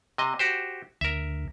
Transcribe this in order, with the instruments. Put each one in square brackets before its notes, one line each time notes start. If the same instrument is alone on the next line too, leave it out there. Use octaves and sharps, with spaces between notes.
[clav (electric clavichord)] C3 D#5
F#4 G4 C5
[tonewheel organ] D2 [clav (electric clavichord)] A#4 E5